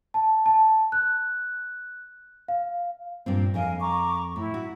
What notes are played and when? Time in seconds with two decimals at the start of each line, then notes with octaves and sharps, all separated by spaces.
0.14 A5
0.46 A5
0.92 F#6
2.48 F5
3.26 G2 A#2 C4
3.54 F2 A#4 D#5 F5 G#5
3.80 A#5 C#6 D6
4.36 A2 E4
4.54 F#4